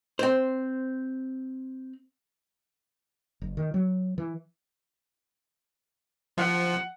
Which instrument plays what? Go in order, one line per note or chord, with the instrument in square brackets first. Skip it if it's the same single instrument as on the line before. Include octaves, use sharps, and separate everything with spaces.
[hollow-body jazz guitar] C4 C5
[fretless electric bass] F#1
D#3
F#3
E3
[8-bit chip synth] F3 [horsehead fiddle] F#5